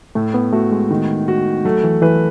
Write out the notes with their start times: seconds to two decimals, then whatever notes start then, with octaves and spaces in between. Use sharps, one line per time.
0.15 A2 A3
0.34 B3
0.53 A3 F#4
0.72 G#3
0.90 D#3
1.28 F#4
1.65 F#3 A3
1.84 E3
2.02 E3 B4